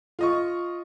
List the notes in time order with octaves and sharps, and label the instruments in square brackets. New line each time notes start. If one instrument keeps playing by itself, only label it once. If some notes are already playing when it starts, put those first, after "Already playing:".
[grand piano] F4 D#5 C#6